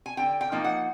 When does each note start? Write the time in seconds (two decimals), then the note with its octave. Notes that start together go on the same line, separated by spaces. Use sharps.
0.06 G#5
0.17 D3 G5
0.41 G5
0.52 F3 A#3 D#4
0.64 F#5